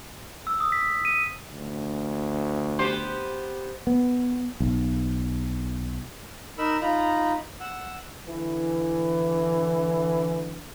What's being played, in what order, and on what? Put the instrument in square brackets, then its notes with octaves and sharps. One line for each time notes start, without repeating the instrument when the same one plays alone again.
[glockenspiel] E6
D#6
B6
D#7
[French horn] D2
[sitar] B3 G4 C5
[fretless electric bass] B3
B1
[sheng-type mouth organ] D#4 A#4 B5 E6
D#4 F4 A#5 B5
F#5 E6
[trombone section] D3 E3